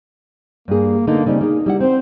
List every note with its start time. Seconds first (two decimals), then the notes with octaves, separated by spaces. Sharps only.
0.68 G2 A#3 G#4
1.07 D3 A#3 B3 D#4
1.26 C#3 G3 C4 D#4
1.41 A#3 D#4 G#4
1.66 G3 E4 F#5
1.80 C4 C5